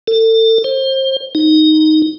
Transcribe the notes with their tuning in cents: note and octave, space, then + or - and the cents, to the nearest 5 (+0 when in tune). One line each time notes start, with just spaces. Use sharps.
A4 +30
C5 +30
D#4 +0